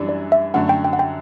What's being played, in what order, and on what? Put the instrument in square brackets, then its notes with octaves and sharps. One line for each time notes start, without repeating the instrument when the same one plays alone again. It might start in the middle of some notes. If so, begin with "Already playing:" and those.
Already playing: [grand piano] F#2 E3 G3 D4
[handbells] D5
E5
[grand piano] F#2 D3 A3 [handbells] F#5
[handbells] G5
G5
F#5
G5